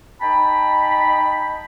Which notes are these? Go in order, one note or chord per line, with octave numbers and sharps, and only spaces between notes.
D#4 G5 A5 B5